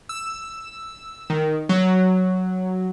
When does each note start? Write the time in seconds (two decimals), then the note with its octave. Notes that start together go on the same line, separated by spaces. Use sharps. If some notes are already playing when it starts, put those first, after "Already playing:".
0.09 E6
1.30 D#3
1.69 F#3